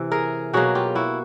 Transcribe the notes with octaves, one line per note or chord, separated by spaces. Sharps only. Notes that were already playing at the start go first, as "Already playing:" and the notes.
Already playing: C3 E3
G#4 A#4
B2 F#3 A#3 F#4 G#4
F4 G4
E4 F#4